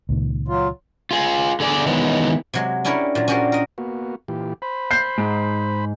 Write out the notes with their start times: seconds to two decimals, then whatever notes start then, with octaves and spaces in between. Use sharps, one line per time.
0.09 C#2 A#2 D#3
0.48 F#3 F4
1.11 F4 G#4
1.60 D3 G#4 D5
1.86 D#3 E3 F#3 G#3 B3
2.54 C3 F#3 G#3
2.85 C#4 D4 E4 G4 A#4 C#5
3.15 A#2 F#3
3.28 C#4 D4 F#4 G4 A#4 C5
3.52 A#4 D#5
3.78 A#3 B3 F#4
4.28 A#2 E3 G4
4.62 C5 B5
4.91 G6 C7
5.18 G#2